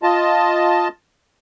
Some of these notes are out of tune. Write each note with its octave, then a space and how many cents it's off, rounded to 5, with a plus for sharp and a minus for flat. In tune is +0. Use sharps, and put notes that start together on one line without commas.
F4 +0 D#5 +0 A5 +0